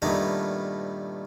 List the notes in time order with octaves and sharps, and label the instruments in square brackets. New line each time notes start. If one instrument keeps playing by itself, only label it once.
[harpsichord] G2 A#2 D#3 A3 B3 D#4